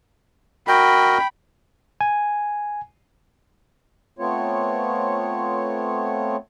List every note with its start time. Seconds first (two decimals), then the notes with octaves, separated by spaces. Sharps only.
0.68 F#4 A#4 D#5 G5 B5
2.01 G#5
4.19 A3 B3 C4 F4 C#5